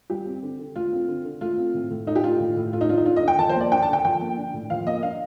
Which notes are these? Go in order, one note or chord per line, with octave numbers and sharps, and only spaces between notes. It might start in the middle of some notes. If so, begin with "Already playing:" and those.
G3 G4
C4
D3
D3
A3 F4
C4
D3
D3
A3 F4
C4
A2
A2
A3 D#4
G4
D4 F4
A2
A2
A3 F4
D#4
D4 F4
D#4
D4 F4
D#5
D3
G5
F3 A5
C5
A#3
D5
D4 G5
A5
D3
G5
F3 G5
A#3
D4
A2
F3 F5
A#3 D#5
D4 F5